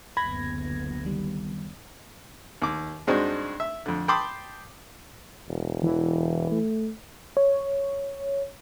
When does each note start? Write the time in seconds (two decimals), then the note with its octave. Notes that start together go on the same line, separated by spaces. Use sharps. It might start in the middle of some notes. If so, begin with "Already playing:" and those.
0.17 F#1 D2 B3 B5 G#6 A#6
1.05 D#3 G3
2.62 D#2 D6
3.07 G2 G#3 C4 D4 D#4 F#4
3.60 E5
3.86 F2 D3
4.08 G5 A5 B5 C6 D6 D#6
5.49 E1
5.83 E3
6.51 A3
7.37 C#5